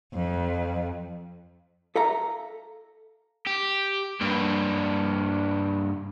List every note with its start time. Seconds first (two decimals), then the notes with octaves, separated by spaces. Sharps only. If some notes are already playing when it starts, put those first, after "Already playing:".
0.13 F2
1.96 A4 E5 F5 A#5
3.47 G4
4.21 G2 A#3